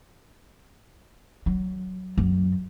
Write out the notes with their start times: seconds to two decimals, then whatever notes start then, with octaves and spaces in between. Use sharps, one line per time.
1.46 F#3
2.18 F#2